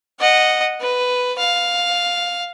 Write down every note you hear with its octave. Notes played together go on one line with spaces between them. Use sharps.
D#5 F#5
B4
F5